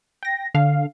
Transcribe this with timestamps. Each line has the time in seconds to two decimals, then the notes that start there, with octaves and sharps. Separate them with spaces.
0.23 G5 A#6
0.54 D3 F5